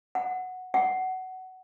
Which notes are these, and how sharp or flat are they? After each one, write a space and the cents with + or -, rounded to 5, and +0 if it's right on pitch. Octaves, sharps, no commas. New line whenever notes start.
F#5 +0
F#5 +15